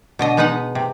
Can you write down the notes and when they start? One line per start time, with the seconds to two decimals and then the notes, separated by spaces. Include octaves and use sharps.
0.19 B2 D3 D#5
0.37 G#3 B3 D#4 B4 F#5
0.75 C3